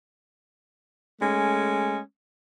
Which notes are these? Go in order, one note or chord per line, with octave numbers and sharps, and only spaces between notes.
G#3 A3 C#4